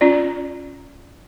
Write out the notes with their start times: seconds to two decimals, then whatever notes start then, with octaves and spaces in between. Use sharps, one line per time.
0.01 C#4 F4 D5